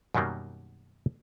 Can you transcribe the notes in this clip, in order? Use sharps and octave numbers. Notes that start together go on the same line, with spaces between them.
F#2 B2 D#3 F#3 G3 A#3